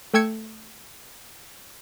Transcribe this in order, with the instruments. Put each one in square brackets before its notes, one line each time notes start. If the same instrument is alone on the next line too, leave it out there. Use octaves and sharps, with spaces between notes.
[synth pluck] A3 G5 E6 G#6 C#7